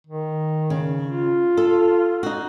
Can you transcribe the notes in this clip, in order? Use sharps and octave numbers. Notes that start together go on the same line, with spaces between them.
D#3
C#3
F4
A4
D#4 F#4